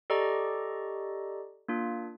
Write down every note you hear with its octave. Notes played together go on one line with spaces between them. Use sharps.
G4 A4 D5 D#5 A#5 C#6
A#3 D4 F4